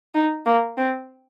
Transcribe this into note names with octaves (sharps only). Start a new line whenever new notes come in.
D#4
A#3
C4